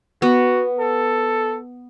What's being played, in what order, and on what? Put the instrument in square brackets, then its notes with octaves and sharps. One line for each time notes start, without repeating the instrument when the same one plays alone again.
[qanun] B3 [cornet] F#4
[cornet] A4